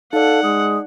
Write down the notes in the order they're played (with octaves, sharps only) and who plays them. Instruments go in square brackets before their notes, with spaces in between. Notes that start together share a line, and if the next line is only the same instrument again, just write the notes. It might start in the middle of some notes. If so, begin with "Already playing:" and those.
[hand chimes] D#4 D5 [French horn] A4 [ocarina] F5 [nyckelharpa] F#5
[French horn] G#3 [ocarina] D#6